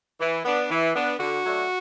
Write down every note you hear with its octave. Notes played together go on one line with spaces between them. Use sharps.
E3
B3 D4
E3
B3 D4
D3 F#4
F#3 A3 D4